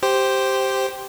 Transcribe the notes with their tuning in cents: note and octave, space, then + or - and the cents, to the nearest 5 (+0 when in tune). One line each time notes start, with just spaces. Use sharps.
G4 -5 C5 +0